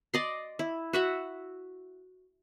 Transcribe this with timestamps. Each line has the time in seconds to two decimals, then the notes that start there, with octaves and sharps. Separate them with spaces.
0.14 D5 D#5 C6
0.59 E4
0.93 F#4 E5 F#5